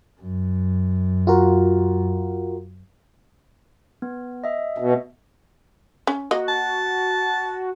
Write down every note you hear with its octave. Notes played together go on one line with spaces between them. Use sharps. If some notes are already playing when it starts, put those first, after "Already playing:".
F#2
F4 F#4 A#4
B3
D#5 E5
B2
C#4
A#3 F#4 D#5
A5